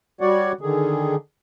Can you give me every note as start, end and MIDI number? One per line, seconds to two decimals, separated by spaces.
0.21 0.52 55
0.21 0.52 66
0.21 0.52 73
0.21 0.52 74
0.21 0.52 78
0.61 1.15 50
0.61 1.15 51
0.61 1.15 68